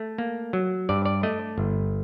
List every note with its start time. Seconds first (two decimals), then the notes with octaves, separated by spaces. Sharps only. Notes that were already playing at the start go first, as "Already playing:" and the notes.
Already playing: A3
0.18 A#3
0.53 F#3
0.89 G2 D5
1.05 D5
1.23 A3 D#5
1.58 G1